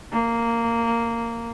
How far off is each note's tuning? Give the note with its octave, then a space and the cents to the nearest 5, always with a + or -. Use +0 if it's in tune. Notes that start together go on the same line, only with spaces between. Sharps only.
A#3 -10